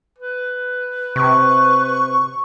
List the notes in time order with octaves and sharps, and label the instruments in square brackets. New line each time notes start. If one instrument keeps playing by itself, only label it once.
[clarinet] B4
[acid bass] C3 [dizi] C#6